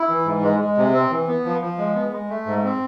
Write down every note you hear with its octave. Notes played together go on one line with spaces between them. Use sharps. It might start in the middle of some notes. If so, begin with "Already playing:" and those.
Already playing: E4
E3
G#2
G#3
G#3
C3
C4
E3
B3
F3
F3
G#3
B3
G#3
A3
G#2
C4